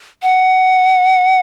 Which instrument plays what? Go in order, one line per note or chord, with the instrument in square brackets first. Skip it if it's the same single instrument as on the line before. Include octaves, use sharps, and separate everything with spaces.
[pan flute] F#5